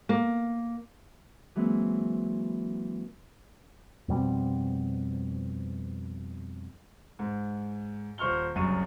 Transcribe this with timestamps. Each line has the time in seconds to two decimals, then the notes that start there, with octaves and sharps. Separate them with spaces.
0.09 A#3
1.56 E3 F#3 G#3 A#3 C4 E4
4.08 F2 B2 G3 C4
7.19 G#2
8.18 D#1 C5 C#6 F6 G7
8.55 F#1 C2 F#2 C#6 D#7